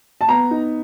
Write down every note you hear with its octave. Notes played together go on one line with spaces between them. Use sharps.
A5
B3 A#5
D#4